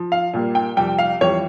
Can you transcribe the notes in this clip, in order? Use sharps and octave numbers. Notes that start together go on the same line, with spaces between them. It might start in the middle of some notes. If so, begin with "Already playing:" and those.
Already playing: F3
F5
A#2 G3 A#3
G5
F2 C3 G3 G5
F5
F2 E3 G3 C#5